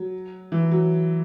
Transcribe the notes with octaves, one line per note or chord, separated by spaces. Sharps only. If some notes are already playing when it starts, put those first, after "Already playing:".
Already playing: F#3
E3
F#3